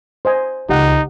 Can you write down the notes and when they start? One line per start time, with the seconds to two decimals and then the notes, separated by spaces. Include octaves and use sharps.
0.25 C5 D#5 G#5
0.69 C#2 D#4 G4 F#5